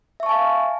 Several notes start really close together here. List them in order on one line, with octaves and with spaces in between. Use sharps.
E5 C#6 A5 G#5 F5